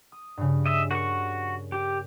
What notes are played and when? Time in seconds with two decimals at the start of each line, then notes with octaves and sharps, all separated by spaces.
0.12 D#6
0.37 G2 C#3
0.66 D#5 E5
0.91 F#4 A#4 C#6
1.72 G4